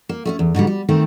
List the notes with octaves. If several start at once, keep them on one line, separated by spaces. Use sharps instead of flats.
A#3
A3 C4 C#4
E2
G#2 B2 D3 G3
G3
D#3 A3 C4